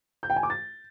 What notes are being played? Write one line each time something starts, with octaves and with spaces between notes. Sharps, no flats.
G6
G5
G#5
D6
A6